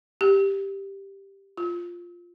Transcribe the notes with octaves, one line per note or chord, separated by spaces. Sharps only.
G4
F4